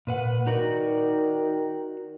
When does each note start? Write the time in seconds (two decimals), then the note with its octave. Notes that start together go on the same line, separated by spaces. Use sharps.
0.07 A#2 B4 F#5
0.47 D#3 D#4 F#4 D5